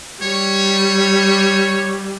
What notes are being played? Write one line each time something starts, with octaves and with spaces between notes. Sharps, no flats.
G3 C#5